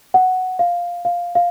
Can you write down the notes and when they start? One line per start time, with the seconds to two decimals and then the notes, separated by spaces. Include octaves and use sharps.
0.14 F#5
0.59 F5
1.05 F5
1.35 F5